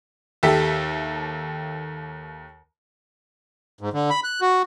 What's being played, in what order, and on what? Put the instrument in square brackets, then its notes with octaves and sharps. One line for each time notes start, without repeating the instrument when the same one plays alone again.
[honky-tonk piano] D#2 G4 A4 E5 B6
[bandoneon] G#2
D3
B5
F#6
F#4